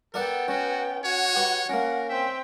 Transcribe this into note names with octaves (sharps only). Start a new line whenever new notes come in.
B3 A4 A#4 D5 F#5 G5
C#4 F#4
F#4 C#5 F#5
G4 B4
A#3 C#4 A#4 F#5
C4 E5 G5